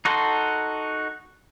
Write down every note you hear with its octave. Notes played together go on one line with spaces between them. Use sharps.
D#4 F#4 A4 C6